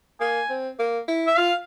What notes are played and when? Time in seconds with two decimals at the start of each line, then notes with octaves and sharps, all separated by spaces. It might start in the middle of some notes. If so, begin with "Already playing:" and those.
0.21 A#3 G#5
0.50 C4
0.79 A#3
1.08 E4
1.27 E5
1.37 F4 F5